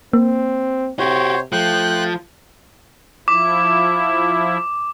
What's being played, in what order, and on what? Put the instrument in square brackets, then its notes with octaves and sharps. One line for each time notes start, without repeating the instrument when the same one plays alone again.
[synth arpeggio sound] A#3 [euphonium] C4
[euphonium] C3 [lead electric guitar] F#4 G4 [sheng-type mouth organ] C5 C#5
[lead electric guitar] F3 [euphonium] A3 [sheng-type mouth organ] G5 F#6
[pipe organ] F3 E4 [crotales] D6